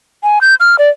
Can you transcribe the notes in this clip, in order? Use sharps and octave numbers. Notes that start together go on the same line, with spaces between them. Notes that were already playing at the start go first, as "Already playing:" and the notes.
G#5
G6
F6
D5